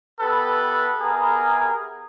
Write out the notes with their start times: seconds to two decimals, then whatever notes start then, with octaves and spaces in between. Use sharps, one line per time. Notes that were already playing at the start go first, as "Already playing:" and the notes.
0.20 B3 E4 G4 A4 B4
1.01 B3 E4 G4 G#4 A#4